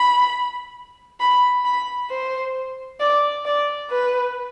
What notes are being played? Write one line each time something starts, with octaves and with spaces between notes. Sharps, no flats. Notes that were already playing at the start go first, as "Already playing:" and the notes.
Already playing: B5
B5
B5
C5
D5
D5
B4